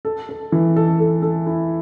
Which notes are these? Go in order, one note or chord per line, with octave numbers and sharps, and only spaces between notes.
A4
A4
E3
A4
A4
A4
E4